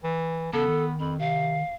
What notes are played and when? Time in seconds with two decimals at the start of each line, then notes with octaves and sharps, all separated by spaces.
0.04 E3
0.53 E2 C#3 B3 A4 A5
0.68 D#3
1.00 F2 B5
1.19 C3 F5